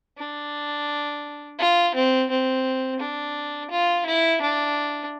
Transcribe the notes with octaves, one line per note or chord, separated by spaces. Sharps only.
D4
F4
C4
C4
D4
F4
E4
D4